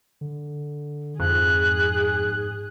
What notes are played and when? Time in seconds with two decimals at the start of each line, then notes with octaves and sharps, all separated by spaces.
0.21 D3
1.20 F2 G#2 G#4 F#6